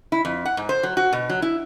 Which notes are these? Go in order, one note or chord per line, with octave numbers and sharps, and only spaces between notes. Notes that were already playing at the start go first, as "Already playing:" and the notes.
E4
F2
F#5
G#2
C5
F#3
F#4
B2
F#3
E4